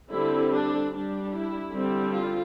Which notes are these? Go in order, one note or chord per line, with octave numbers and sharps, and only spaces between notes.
D3 G3 C4 E4
D4
G3 D4
E4
D3 G3 C4
F4